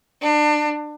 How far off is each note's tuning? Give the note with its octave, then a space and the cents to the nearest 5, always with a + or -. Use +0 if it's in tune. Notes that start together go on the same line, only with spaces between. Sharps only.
D4 +25